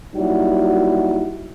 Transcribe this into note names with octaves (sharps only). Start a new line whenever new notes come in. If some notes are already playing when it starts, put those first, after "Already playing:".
F#3 G3 A#3 D#4 E4 F#4